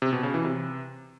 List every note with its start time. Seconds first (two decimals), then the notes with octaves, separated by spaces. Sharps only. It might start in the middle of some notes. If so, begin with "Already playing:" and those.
0.02 C3
0.13 B2
0.23 C#3
0.34 E3
0.45 C3